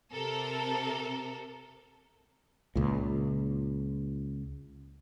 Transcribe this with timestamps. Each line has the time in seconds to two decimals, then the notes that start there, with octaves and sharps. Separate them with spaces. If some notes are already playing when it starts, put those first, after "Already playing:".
0.13 C3 A4 A#4
2.75 C#2 A#2